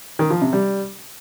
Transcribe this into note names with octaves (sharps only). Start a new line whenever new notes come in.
D#3
F3
C3
G3